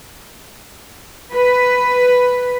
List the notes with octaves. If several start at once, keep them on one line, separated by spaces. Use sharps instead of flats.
B4